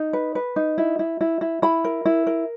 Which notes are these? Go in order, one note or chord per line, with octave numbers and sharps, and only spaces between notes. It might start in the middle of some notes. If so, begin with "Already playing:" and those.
Already playing: D#4
B4
B4
D#4
E4
E4
E4
E4
E4 B5
A#4
E4
A#4